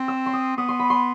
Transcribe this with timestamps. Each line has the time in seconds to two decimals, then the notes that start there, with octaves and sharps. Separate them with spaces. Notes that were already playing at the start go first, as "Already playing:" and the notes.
Already playing: C4
0.08 E6
0.26 C6
0.33 D#6
0.57 B3 D#6
0.69 C6
0.79 B5
0.90 C6